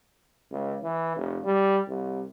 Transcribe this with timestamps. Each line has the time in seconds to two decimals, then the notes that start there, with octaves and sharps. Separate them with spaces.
0.51 C#2
0.83 E3
1.16 F1
1.44 G3
1.88 C2